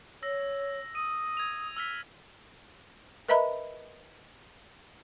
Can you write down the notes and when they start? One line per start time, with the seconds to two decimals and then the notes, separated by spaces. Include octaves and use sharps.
0.23 C#5 E6 A#6
0.95 D#6 D#7
1.37 G#6 F7
1.77 E6 F6 B6
3.29 A#4 B4 D#5 E5 A#5 B5